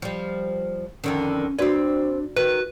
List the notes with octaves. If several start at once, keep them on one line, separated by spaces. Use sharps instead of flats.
F3 G3
F2 D3 D#3 C#4
C4 D4 F#4 B4 D5
D#3 F#4 B4